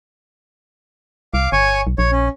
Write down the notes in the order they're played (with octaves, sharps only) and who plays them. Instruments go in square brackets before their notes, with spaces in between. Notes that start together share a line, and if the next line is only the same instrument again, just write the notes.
[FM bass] C2 [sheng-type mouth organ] F5 D6
[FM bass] G1 [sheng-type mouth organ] C#5 G#5 C#6
[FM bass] B1
[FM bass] A#1 [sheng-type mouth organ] C#5
[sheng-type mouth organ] C#4